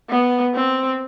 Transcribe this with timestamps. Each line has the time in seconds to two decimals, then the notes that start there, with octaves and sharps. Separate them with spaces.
0.09 B3
0.54 C4